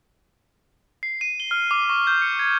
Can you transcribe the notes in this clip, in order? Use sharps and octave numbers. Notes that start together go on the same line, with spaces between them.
C7
D#7
G7
F6
D6
C#6
G6
C#7
G#6